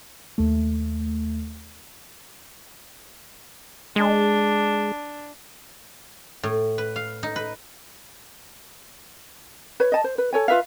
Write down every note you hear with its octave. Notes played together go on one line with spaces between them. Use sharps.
D#2 A3
G#3 D4
A2
B4
F5
D#4
B4
B4 C#5
D#5 A5
C5
B4
A4 C#5 G#5
F4 B4 E5 F5